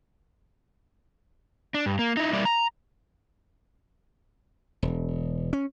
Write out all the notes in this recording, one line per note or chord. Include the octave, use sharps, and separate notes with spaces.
D4
G2
A#3
D#4 E4
G3 A#3 E4 D5
A#5
E1
C#4